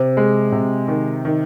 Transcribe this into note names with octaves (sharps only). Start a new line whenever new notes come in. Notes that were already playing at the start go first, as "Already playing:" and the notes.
Already playing: C3 C5
G#3
C3
D#3
D#3